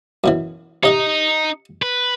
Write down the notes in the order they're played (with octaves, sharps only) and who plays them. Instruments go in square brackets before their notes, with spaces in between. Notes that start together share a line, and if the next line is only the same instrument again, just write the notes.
[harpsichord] F#2 B2 E3
[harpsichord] C3 D#5 F#5 [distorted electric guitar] D#4
[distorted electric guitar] B4